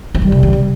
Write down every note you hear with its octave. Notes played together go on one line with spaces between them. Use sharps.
F3
D#3 G3
C3
D#3
C3